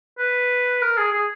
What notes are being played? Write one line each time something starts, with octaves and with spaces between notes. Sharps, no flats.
B4
A#4
G#4
G#4